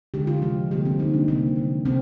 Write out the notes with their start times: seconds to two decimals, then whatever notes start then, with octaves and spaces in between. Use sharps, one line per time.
0.14 D3 G#3 G4
0.27 F4
0.42 C3 F3 G#3
0.71 D3 G3 A#3 G4
0.85 C4
0.99 D3 G3 A#3 D#4
1.14 D4
1.28 C3 D#3 G3 A#3 C4
1.56 D3 F3 G#3
1.85 C3 C4